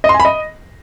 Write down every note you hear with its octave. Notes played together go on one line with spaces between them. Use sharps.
D#5
C6
G#5
B5
D#5